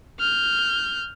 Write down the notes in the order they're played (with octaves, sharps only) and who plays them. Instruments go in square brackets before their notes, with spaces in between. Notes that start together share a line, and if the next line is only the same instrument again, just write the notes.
[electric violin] F6 G6